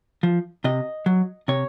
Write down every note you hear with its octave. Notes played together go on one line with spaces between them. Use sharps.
F3
C3 D#5
F#3
C3 C#5